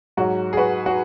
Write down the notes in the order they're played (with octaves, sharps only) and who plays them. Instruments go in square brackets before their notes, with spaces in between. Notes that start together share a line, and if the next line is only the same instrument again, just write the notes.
[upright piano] G#2 F#3 F#4
G#4
F#4 B4
F#4